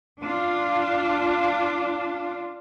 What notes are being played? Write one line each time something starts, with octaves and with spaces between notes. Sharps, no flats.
D4 F4